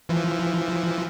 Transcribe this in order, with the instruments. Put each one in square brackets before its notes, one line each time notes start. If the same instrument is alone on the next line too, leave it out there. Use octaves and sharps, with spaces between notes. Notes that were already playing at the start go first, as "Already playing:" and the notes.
[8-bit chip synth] E3 F3